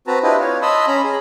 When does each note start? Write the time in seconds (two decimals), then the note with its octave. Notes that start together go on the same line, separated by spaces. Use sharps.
0.07 C4 F#4 B4 A5 A#5
0.23 D4 E4 F4 G4 B4 D#5
0.40 C#5 F5
0.62 D#5 A5 B5 C6 D#6 E6
0.87 C#4 A#5 B5
1.04 G#4